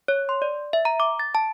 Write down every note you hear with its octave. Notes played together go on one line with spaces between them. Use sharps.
C#5
C6
D5
E5
A#5
D6
A6
A5